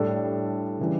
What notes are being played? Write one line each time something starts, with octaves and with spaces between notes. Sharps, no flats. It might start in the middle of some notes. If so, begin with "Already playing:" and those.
Already playing: A2 G3 D4 A4
C#3 E3 G3